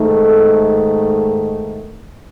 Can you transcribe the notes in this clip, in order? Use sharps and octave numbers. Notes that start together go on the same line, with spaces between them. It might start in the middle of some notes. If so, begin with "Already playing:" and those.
Already playing: G#2 D#3 A3 D#4
A4